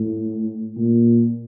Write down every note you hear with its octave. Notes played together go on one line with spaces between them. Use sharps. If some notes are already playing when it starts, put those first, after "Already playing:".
Already playing: A2
A#2